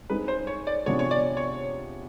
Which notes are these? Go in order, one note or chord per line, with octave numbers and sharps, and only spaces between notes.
G#3 C4 D#4 G#4 B4
C5
C#5
D5
C3 F3 G#3 B3 D4 C#5
C#5
D5
C#5